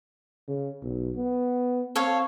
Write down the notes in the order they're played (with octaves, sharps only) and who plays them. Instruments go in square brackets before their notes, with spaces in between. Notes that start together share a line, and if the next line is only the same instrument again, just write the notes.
[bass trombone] C#3
B1
B3
[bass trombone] C4 [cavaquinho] A4 C#5 F5